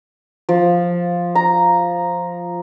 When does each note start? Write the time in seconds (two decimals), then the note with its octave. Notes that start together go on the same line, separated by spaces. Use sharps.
0.49 F3
1.35 A#5